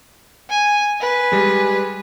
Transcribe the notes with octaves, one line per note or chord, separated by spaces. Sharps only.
G#5
B4 G#5
G3 G#3